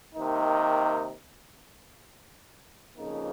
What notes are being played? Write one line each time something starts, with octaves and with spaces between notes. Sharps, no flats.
C3 D#3 A#3 D#4
F2 C#3 F3 A#3 D#4